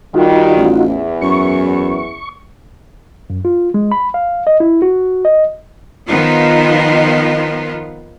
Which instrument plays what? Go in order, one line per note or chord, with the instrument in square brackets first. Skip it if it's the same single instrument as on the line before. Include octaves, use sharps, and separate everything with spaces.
[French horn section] D#3 G3 [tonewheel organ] D#4 F4 F#4
[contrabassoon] A1
[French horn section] E2 E3
[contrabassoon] F#2 [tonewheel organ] C#6
[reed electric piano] F#2
F4
G#3
B5
F5
D#5
E4
F#4
D#5
[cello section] D#3 F3 B3 D#4 F4